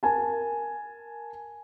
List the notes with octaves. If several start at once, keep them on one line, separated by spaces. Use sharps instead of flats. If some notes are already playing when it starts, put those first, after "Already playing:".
A#4 G#5 A5